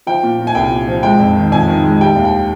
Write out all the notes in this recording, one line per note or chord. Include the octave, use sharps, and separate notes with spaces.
F3 G5
A#2
A#2
G#5
C2 G5
A#2
F3
G#3 G5
F2
D#3
F2 G#5
D#3
G#3
G3 G5
D#2
G5